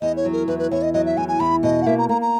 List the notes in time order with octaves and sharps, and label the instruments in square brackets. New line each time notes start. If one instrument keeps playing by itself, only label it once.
[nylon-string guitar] E2 [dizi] D#5
[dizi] C#5
[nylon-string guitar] F#3
[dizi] A#4
[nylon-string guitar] E2 [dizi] B4
[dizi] B4
[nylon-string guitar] E2 [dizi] C#5
[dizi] D#5
[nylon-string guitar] F#3 [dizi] D#5
[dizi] E5
[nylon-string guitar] E2 [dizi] G#5
[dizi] G#5
[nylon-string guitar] E2 [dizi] B5
[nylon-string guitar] B2 [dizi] D#5
[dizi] F#5
[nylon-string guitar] A#3 [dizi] E5
[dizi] A#5
[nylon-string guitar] A#3 [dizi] A#5
[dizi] A#5